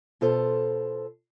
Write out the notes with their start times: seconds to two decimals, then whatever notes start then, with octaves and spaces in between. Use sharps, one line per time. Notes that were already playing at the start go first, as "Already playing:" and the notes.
0.21 B2 F4 A4 C5